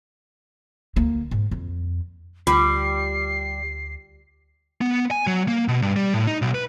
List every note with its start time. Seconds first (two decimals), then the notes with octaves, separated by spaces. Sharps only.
0.96 D2 A#3
1.31 G#2
1.51 F2
2.47 D2 G3 F4 C7
4.81 B3
5.11 G#5
5.27 F#3
5.48 A#3
5.68 B2
5.82 G2
5.96 G3
6.14 A2
6.27 D#4
6.42 B1
6.55 B4